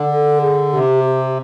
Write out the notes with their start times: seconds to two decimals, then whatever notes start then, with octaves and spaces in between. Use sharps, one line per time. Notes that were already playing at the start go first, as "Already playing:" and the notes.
Already playing: D3
0.11 A4
0.42 G#4
0.73 C3 G4
1.04 G4